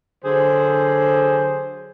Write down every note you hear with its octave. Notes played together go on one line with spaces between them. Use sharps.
D3 F#3 G#4 C5